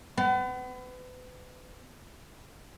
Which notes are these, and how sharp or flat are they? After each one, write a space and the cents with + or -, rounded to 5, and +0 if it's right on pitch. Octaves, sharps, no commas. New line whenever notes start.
B3 +35